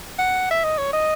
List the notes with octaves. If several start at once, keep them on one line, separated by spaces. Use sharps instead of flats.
F#5
E5
D#5
C#5
D#5